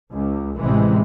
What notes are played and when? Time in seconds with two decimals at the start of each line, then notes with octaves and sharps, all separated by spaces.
0.12 C#2
0.60 A1 C3 E3 G#3